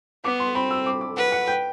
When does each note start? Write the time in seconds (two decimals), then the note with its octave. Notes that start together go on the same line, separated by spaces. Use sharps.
0.24 B3 D6
0.40 C6
0.55 C4 B5
0.71 E6
0.86 D6
1.01 D6
1.17 B4 F#5
1.32 F#5
1.48 G5